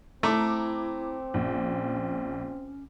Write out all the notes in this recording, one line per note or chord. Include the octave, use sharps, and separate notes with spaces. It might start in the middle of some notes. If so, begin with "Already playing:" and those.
A3 C4 E4 A#5 D6
A#1 C#4